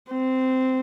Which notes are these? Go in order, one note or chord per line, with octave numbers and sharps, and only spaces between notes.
C4